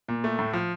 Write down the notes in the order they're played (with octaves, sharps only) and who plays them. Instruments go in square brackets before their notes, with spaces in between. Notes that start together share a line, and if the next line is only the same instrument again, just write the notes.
[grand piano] A#2
A3
A2
F3